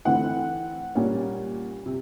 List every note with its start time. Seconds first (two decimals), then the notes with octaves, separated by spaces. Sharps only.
0.05 E3 A3 C4 F#5
0.95 A#2 G3 A#3 C#4
1.86 C3